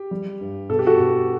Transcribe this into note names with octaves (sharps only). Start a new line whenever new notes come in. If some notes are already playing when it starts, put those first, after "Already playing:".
Already playing: G4
G3
G2
B2 A4
G4
F#4 A4
B2